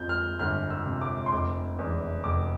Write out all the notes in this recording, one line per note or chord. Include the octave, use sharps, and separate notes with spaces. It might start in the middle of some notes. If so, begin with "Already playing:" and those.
Already playing: F2 G6
F6
G1 F6
E6
C3
D6
C6
F1 D6
E2
F1 D6